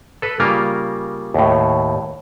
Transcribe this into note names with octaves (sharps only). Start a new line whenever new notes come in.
A4 B4
C#3 G3 A#3 F4 A#4
D#2 A2